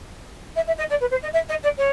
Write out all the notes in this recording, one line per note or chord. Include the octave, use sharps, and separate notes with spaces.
E5
E5
D#5
D5
B4
C5
D#5
E5
D#5
D5
C#5